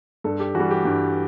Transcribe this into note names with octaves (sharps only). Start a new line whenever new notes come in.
G2 A4
G4
E3 G3 F#4
G4
G2